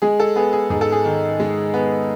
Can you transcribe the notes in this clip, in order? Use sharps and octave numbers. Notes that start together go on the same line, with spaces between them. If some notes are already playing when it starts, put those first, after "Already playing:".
G#3 G#4
A4
B3 G#4
G#4
G#2 G#4
A4
G#4
D#3
G#3
B3